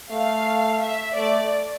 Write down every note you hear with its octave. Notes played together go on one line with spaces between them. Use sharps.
A3 F5
E5
A3 D5